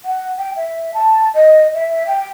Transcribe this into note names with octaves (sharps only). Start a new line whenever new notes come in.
F#5
G5
E5
A5
D#5
E5
G5